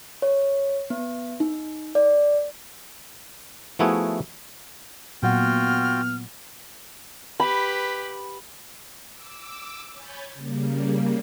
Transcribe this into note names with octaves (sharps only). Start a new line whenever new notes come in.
C#5
B3
D#4
D5
F3 A3 B3 E4 F#4 G#4
A#2 F#3 B3 F4 F#4 F#5 G5 F6
G4 B4 B5
D6 E6
C#5 G#5 B5 G6 A6
C#3 G3 A#3